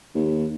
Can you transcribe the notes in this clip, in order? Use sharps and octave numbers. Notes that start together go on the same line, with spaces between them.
D#2